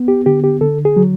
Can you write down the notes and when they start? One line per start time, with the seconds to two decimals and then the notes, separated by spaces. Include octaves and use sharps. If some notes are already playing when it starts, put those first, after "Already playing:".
Already playing: B3
0.08 G4
0.26 D3 G4
0.44 G4
0.61 D3 A4
0.85 G#4
0.97 F#3